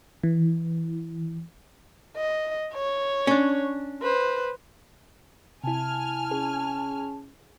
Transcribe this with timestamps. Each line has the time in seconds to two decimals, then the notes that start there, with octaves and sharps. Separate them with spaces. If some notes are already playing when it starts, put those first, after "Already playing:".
0.23 E3
2.16 D#5
2.74 C#5
3.27 C#4 D4
4.02 B4 C5
5.64 C3 E4 G#5 A5 F6
6.31 C#4 G#4